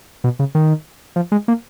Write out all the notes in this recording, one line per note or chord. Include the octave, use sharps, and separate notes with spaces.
B2
C#3
D#3
F3
G#3
A#3